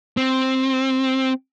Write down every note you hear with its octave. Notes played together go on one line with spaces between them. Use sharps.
C4